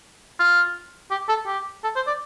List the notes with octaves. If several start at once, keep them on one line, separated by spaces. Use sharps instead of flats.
F4
G4
A4
G4
A4
C5
D5